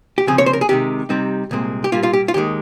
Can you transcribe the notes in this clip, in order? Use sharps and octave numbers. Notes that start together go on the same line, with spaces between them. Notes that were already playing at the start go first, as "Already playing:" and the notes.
G4
C#2 C#3 F3 C4 G#4
C#5
C5
A#4
G#4
C3 D#3 G#3 G4
C3 G3 C4 D#4
C2 A#2 G#3 C4
G4
A#2 G3 A#3 F4
F4
G4
F4
D#2 D#3 G#3 G4